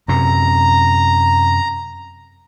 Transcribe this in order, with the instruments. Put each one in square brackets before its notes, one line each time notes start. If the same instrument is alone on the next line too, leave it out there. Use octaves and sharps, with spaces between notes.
[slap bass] F#2 C3 [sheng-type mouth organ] A#5